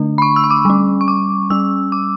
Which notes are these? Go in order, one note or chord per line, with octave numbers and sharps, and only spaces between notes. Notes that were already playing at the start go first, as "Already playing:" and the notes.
Already playing: D3 A3 D4
B5
C#6
E6
C#6
D6
G3 C#4
C#6
D6
G3 C#4 E6
D6